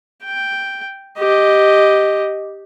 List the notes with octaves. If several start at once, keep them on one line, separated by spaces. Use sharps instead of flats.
G5
G4 D#5